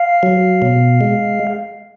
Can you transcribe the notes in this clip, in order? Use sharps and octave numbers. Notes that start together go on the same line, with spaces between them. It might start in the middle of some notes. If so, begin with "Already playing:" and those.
Already playing: F5
F#3
B2
G#3